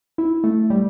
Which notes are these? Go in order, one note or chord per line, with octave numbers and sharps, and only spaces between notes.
E4
A3
G3